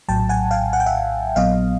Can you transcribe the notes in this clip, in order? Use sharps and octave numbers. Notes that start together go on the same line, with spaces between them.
A#1 A2 F#3 G5 A5
F#5 G#5
F5 G5
F#5
G5
E5 F#5
A#1 A#2 F#3 B3 D#5 F5